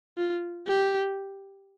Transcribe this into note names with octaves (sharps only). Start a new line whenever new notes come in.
F4
G4